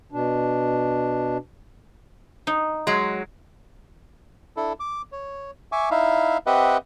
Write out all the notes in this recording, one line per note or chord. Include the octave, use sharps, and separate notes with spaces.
B2 D4
D#4
F#3 G#3
D4 E4 A4
D6
C#5
E5 G#5 C#6 D6
D#4 E4 E5 F5
C4 G4 B4 D#5 E5 F#5